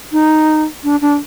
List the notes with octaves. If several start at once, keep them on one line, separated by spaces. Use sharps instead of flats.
D#4
D4
D4